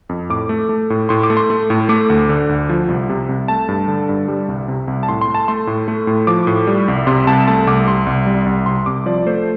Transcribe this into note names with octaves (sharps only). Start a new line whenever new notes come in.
F2
A2 D6
A3
A3
A2
A2 C6
D6
A3
C6
A3
A2
A3 D6
D2
D3
D2
F3
C2
C3
C2
A3 A5
G2
D3
G2
G3
C2
C3
C2
A5
A2 C6
C6
A3
A5
A3 C6
A2
A3
A2
F3 D6
A2
G3
C2
C3 C6
C2 A5
A3 A5
C2 D6
C3 C6
C2
G3
C2
C3 C6
C2 D6
F3 D5
A3 C5